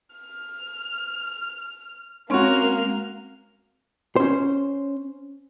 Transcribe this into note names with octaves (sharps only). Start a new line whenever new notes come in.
F6
G#3 A#3 C4 C#4 F#4 C#6 F6
C#4 C5